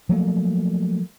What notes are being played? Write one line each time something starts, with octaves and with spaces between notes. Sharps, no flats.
F3 F#3 A3 A#3